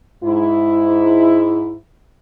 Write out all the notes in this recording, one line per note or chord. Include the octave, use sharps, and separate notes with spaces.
G#2 E4